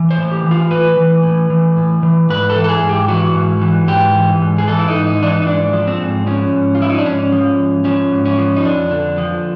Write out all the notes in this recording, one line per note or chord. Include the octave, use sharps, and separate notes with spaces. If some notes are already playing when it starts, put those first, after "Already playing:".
Already playing: E3
C5
A2
G4
E3
F4
A2 B4
E3
A2
E3
A2
E3
G#2 B4
A4
E3
A4
G#4
G#2
G4
E3 F#4
G#2
E3
G#2 G4
E3
G#2
G#4
E3 A4
E4
D#4
G#2
D#4
E3 D4
D#4
D#4
G#2 D4
F3
C4
G#2
F3 C#4
G#2
F4
F3 E4
D#4
D4
G#2 C#4
F3
G#2
F3 C#4
G#2
C#4
F3
D#4
F2 D4
D3
F3